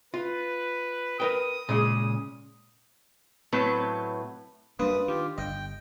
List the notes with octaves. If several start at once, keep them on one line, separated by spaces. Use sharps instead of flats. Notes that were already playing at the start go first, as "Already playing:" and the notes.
F4 B4
A#4 B4 G5 D#6
A#2 C#3 G#3
A2 F#3 C4 B4
F#2 G3 A#3 D4 B4 F5 C6 D#6
D#3 F4 G4
G1 D#5 G5